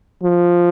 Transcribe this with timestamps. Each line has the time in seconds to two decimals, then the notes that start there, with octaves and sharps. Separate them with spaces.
0.24 F3